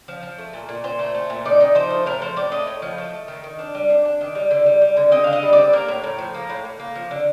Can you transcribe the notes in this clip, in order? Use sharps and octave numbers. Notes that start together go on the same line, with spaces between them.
F3
F3
A3
A#2
A#2
A#2 C5
A3
A3
A#2
D#4 D5
D#4
F3 C5
A3
A2 A#4
F3 C5
A2 D5
A3 D#5
A2
F3
A3
A3
D#3
D#3
D4
G3
D4
D4
D#3
G3
D3
G3
G3
D3
C4 D#5
D3 F5
D#5
G3
D5
C4
A#3 A#4
A2
A2
F3
A#3
A2
A2
A#3
F3
D3